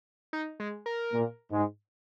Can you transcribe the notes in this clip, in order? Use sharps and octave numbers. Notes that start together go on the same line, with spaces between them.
D#4
G#3
A#4
A#2 A#3
G#2 G#3